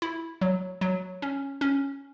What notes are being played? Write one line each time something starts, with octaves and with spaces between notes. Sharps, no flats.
E4
F#3
F#3
C#4
C#4